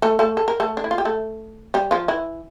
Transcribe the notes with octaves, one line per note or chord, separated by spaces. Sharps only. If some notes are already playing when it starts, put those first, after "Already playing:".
A3 A4
A3 A4
A4
A#4
A3 A4
D4
E4
F4
G4
A3 A4
G3 G4
F3 F4
E3 E4